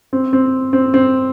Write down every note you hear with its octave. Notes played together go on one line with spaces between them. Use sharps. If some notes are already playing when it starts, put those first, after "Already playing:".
C4
C4
C4
C4